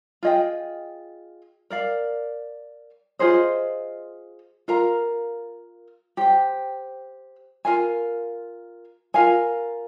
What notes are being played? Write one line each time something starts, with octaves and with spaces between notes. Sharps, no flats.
F4 G#4 D#5 G5
A#4 D5 F5
F4 G#4 C5 D#5
F4 A#4 F5 A#5
G4 C5 G5
F4 A#4 F5 G#5
F4 A#4 F5 G#5